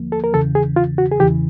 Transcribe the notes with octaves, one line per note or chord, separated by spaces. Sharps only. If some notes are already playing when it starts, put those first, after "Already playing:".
Already playing: D#2 D3 F3 A#3
A4
A#4
E2 C#3 E3 A4
G#4
F4
F#4
G#4
E2 C#3 E3 G4